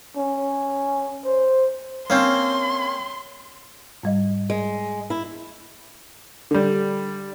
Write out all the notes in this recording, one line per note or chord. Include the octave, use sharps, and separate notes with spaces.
C#4
C5
A#3 C4 C#4 F5 C6
G#2 G3 D#5
G#3
E4
D3 G3